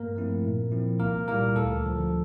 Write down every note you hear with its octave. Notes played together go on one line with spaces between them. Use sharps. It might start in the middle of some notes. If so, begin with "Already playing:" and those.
Already playing: G2 A#3 A#4
F3 A3 C4 E4
A#2
F3 C4 E4
C2 A#3 A#4
A#2 G3 A#3 E4 A#4
D2 A4
D3 F3